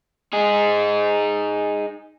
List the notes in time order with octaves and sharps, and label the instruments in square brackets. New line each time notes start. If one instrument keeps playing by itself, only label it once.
[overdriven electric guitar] D#4 G#4